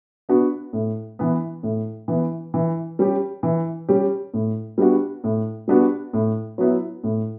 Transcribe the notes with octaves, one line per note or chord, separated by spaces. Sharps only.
B3 D4 F#4
A2
E3 B3
A2
E3 B3
E3
G3 C#4 G4
E3
G3 C#4 G4
A2
G3 B3 D4 F#4
A2
G3 B3 D4 F#4
A2
F#3 B3 E4
A2